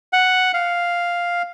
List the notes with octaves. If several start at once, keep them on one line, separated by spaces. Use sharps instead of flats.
F#5
F5